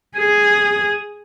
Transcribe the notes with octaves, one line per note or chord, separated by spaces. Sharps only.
G#4